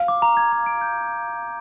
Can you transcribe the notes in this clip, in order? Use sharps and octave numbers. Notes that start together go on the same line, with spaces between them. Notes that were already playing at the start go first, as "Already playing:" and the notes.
Already playing: F5
D6
A#5
G#6
A#5
D7
G6